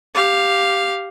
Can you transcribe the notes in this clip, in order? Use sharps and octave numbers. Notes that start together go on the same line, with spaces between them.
G4 F5